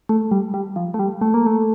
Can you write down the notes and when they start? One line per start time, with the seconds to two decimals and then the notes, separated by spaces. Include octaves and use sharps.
0.09 A3
0.31 G3
0.54 G3
0.76 F3
0.94 A3
0.99 G3
1.21 A3
1.34 A#3
1.46 A3